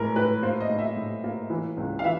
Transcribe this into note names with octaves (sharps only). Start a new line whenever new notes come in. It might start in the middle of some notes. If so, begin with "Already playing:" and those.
Already playing: A2 E3 G#3 A#4
A2 B4
A#3 C5
D#5
A2
E5
A2
A#3
E3
C#2
F5
E3 E5